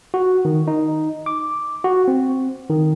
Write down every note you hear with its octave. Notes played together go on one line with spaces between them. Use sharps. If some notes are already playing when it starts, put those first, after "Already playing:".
F#4
D#3
D#4
D6
F#4
C4
D#3